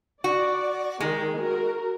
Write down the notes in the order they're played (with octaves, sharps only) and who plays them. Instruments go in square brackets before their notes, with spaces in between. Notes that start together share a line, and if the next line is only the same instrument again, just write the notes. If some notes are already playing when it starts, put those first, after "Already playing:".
[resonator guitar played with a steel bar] F#4 [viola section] D5
[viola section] D#3 G#4 [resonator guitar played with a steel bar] G#3
[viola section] F#4 A#4